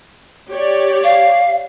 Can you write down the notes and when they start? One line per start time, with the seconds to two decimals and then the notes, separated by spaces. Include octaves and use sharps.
0.51 G4 C#5 D5
1.04 F5